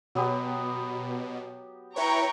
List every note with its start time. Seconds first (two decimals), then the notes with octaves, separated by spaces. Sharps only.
0.15 B2 F#3 B3 G4
1.96 E4 B4 C#5 G5 A#5 C#6